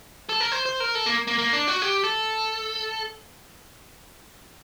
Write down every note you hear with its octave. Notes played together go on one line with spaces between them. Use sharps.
A4
A#4
C5
C5
A#4
A4
A#3
A#3
A#3
D4
F#4
G4
A4